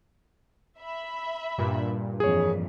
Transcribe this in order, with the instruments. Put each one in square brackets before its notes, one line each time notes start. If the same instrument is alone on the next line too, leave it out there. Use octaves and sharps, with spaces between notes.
[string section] E5 B5
[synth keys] G2 A#2
[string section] F2 E3 [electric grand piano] G#4 C#5